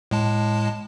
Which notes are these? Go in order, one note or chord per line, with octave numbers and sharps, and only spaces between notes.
A2 G#3 A5